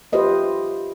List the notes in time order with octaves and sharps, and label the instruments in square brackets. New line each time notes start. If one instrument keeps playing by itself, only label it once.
[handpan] F4 G4 B4 C5 D#5 E5